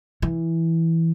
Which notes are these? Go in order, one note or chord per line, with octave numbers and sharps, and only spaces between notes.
E3